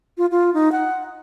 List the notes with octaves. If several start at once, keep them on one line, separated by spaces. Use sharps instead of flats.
F4
F4
D#4
F#5